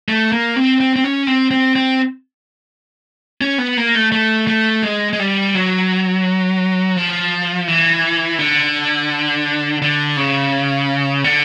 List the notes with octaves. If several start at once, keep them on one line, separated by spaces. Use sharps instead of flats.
A3
A#3
C4
C4
C4
C#4
C4
C4
C4
C#4
B3
A#3
A3
A3
A3
G#3
G#3
G3
F#3
F3
E3
D3
D3
C#3
D3